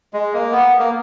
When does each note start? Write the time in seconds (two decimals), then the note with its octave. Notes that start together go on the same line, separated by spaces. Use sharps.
0.13 G#3
0.33 A#3
0.52 B3
0.79 A#3